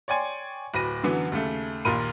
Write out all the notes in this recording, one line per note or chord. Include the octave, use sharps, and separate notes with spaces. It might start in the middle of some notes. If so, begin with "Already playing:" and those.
C#5 D5 G5 G#5 C6 C#6
D1 B4 A#6 D#7
F#2 D3 E3 F#3 B3
D#2 C#3 A3
A#1 D#2 A#2 A#4 B5 D#7